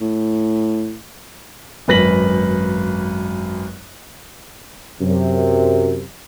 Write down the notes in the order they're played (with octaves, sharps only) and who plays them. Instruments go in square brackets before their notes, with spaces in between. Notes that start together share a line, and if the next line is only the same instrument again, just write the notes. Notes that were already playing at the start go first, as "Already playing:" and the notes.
[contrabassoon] A2
[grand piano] G#1 F#2 B4 A#6 B6 F#7
[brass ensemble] F#2 C3